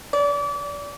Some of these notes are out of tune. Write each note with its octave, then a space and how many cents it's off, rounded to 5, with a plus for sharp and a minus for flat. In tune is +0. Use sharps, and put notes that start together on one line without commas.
D5 -30